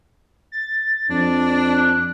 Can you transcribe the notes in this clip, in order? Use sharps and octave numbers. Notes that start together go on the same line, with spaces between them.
A6
F2 D4
F#6